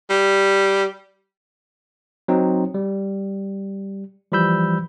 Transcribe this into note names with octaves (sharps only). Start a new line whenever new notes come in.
G3
F#3 C4 D#4
G3
E3 F3 G3 B5 E6 G6